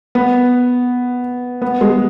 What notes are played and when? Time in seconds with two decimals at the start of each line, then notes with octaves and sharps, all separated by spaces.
0.15 B3
1.62 B3
1.81 G#3